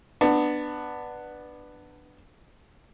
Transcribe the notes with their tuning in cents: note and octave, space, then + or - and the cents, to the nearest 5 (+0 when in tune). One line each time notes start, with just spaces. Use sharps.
B3 +0 D4 +15